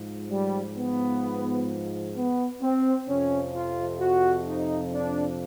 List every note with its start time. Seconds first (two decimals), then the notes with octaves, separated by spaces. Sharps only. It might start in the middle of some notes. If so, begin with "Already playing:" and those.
Already playing: G#2 F3
0.31 G3
0.76 B3
2.16 B3
2.62 C4
3.07 F2 C3 F3 C#4
3.54 F4
4.01 F#4
4.47 D#4
4.94 D4